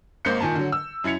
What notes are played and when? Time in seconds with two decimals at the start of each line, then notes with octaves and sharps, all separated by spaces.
0.25 G#1 A#3 C5 D#5 G6 C#7
0.40 A#2 D#3 G#5 A5
0.55 D3 F#3
0.72 E6
1.04 F#2 E4 G#6 C#7 F7